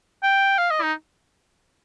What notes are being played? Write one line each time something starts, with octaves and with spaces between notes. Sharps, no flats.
G5
F5
D#5
D#4